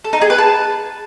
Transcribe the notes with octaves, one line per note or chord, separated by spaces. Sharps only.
A4
D#4
G#4
B4
A5